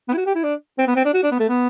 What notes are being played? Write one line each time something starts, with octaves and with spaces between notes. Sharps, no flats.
B3
E4
F#4
G4
E4
D4
C4
B3
C4
D4
F#4
D4
B3
A3
B3